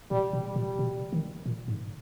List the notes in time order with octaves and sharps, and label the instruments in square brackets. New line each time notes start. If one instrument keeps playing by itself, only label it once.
[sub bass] A#2 [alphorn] G3
[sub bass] B2
[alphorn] G3
[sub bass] A#2
B2
D#3
A#2
G#2